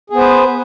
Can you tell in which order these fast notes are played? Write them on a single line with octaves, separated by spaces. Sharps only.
G#4 B3 C5 B4